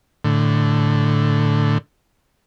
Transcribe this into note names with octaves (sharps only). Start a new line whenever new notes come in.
A2 D3